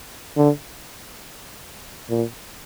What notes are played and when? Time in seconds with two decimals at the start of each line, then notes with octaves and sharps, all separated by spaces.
0.37 D3
2.10 A#2